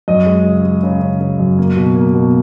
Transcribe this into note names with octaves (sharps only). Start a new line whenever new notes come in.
F#2 D#5
G#3
C#3
G#3
C#3
C#3
C#3
F#2
A#3
B2
A#3
B2